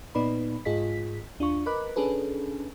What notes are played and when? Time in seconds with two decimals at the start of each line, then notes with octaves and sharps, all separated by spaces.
0.15 A#2 B3 D#4 B4 D5 B5
0.65 G#2 F4 G#4 D#5 B6
1.39 D#2 D4 F4 C#6
1.66 A#4 B4 D#5 B5 D6 F#6
1.96 C#4 D4 G#4 A4 B4